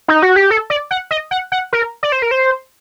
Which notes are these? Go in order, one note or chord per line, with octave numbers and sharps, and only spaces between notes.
D#4
F#4
G4
A4
D5
F#5
D#5
F#5
F#5
A#4
D5
C5
A#4
C5